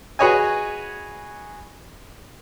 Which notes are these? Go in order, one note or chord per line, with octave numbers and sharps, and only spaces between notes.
F#4 G#4 B4 C#5 D#5 G#5